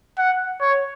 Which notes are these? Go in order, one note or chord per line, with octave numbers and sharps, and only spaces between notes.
F#5
C#5